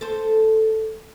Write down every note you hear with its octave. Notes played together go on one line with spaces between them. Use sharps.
A4 C5